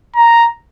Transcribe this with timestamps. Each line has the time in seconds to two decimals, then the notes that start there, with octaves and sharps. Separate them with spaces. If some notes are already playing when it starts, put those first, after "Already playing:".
0.16 A#5